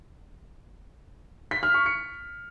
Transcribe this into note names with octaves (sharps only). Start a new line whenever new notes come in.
B6
F6
C#6
C#7